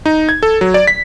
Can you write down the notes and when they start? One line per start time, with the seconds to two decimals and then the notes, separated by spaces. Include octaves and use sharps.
0.06 D#4
0.29 G#6
0.43 A4
0.61 F#3
0.74 D5
0.87 B6